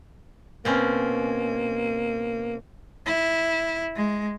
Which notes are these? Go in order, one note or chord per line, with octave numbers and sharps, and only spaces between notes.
B2 A#3 C4 C#4
E4
G#3